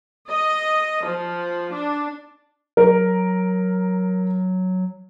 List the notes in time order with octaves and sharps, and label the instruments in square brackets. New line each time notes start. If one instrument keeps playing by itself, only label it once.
[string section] D#5
F3
D4
[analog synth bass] F#3 [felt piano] A#4